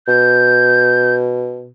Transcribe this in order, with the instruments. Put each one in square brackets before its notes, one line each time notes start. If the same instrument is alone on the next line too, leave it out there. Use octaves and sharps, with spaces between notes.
[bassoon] B2 [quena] G6